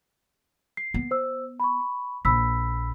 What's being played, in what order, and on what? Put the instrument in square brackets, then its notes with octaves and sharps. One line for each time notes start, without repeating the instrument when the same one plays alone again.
[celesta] C7
[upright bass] B3
[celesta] C5 E6
B5 C#6
[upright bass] A#1 [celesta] B5 E6 B6